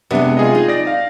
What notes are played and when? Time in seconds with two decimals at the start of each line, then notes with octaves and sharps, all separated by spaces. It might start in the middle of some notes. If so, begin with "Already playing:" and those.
0.11 C3 G#3 B3 D4
0.37 F4 G#4 D#5
0.55 D#4
0.68 D5 A#6
0.87 F5